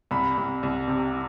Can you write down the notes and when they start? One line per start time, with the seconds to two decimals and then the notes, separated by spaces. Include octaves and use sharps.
0.11 C2 B5
0.37 C2
0.63 C2
0.88 C3